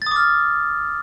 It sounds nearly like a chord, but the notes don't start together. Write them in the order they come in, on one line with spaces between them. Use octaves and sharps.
A6 D#6 D6 F6